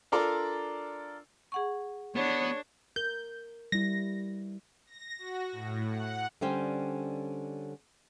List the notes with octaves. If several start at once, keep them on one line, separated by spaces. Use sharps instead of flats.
D4 F4 A4 A#4 D5
G#4 F#5 C#6
B3 D4 C#5
A#4 G6
G3 E4 A#6
A#6
F#4
A2
F#5
D3 G3 C#4 C5 G5